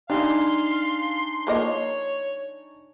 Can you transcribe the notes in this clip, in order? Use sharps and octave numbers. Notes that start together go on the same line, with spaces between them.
E3 G3 D4 D#4 F5 G#5 C6
F3 A#3 C#5 D#5